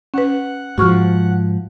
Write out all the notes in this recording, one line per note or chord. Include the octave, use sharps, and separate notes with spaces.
C#4 B4 F#5
G#2 F3 F#4 C#6 F6